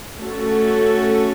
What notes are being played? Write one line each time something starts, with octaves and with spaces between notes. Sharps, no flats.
A3 C#4 F#4 A4